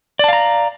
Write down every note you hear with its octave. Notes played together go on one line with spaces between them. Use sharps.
D5 F5 A5 A#5